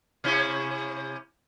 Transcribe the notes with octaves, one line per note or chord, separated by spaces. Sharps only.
C3 C#4 E4